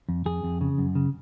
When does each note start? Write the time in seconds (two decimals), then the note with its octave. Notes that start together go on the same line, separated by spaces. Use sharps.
0.09 F2
0.26 F2 G#4
0.43 F2
0.61 C#3
0.78 F#2
0.95 C#3